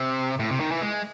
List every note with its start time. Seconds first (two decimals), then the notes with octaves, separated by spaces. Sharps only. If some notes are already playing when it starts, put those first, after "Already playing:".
Already playing: C3
0.40 A2
0.51 C3
0.60 D#3
0.71 E3
0.82 G#3